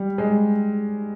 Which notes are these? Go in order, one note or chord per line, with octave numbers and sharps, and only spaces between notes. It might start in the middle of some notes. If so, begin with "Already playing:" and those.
Already playing: G3
G#3